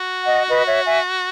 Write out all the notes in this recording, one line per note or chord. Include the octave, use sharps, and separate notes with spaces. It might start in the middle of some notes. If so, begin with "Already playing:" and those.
Already playing: F#4
D#5 F#5
B4 D#5
C#5 E5
E5 G#5